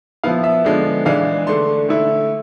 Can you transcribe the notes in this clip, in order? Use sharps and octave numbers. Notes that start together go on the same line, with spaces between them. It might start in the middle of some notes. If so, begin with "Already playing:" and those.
F3 B3 E4 F5
E5
D3 F3 G#3 B3 D4
E3 G#3 D4 F5
D3 A3 D4 C6
D3 A3 E4